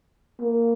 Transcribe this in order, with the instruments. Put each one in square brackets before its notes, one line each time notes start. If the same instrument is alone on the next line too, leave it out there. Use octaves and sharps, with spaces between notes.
[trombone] A#3